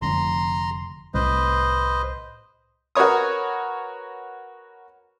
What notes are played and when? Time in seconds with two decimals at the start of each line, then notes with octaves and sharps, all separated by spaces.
0.02 F1 D3 F3 A#5 C6
1.14 C2 A2 B4 C5 D#5
2.95 F#4 A#4 B4 C#5 D#6